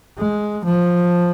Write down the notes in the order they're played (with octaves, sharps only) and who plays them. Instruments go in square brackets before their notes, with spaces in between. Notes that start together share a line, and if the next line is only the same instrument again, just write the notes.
[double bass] G#3
F3